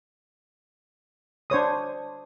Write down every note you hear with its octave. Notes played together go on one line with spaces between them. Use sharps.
D4 C5 C#5 D#6